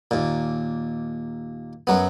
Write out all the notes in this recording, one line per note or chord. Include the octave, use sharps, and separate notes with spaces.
D#2 A#2
F#2 F#3 B3